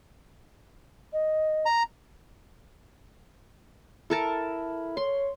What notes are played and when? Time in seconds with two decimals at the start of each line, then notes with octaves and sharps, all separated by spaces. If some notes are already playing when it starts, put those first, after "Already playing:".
1.13 D#5
1.66 A#5
4.10 E4 A4 A#4 A5
4.97 C#5 C6